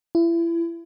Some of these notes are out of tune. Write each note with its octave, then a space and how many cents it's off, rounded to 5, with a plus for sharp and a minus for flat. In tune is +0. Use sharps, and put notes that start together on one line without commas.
E4 +30